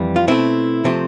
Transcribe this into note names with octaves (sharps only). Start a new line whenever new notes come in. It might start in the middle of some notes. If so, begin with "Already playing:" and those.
Already playing: F2 E3 G3
F4
B2 A3 C4 E4
C3 F3 A3 C4